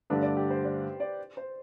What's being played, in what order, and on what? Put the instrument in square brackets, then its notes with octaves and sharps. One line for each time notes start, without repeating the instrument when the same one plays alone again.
[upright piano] G2 D3 A3 D4 [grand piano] B4
[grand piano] D5
G4
C5
D5
D5
C5